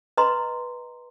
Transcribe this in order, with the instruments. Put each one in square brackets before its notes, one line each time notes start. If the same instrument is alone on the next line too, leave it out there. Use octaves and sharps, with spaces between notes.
[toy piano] B4 D#5 A#5 C6